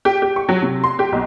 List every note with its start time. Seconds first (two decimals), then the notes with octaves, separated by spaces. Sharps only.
0.05 G4
0.22 G4
0.36 C#6
0.49 F#3
0.62 C3
0.84 C6
0.99 G4
1.12 B1